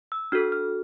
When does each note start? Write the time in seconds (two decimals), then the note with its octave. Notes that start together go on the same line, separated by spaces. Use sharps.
0.12 E6
0.32 D4 F#4 A4 F6
0.52 F6